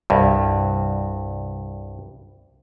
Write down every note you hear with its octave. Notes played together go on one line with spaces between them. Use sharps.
C2 G2